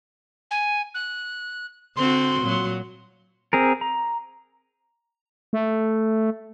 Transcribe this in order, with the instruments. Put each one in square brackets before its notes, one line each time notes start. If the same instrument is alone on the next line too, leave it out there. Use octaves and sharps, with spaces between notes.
[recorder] G#5
F#6
[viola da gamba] D3 C4 F#4 [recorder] C6
[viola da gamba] A#2 F#3
[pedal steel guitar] C4 G#4 A#4
A#5
[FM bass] A3